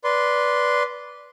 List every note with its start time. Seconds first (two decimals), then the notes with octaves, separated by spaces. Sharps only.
0.04 B4 D5 C6